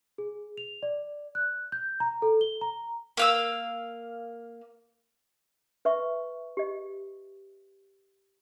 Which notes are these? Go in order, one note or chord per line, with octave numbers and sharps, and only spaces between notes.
G#4
F7
D5
F#6
G6
A#5
A4
G7
A#5
A#3 F5 E6
B4 E5 C#6
G4 D#5